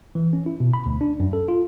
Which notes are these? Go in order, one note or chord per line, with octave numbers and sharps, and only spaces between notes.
E3
C#4
E4
B2
B5
D2
D4
F#2
A4
F4